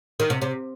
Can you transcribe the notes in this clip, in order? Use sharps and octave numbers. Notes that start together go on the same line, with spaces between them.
D#3
C3
C3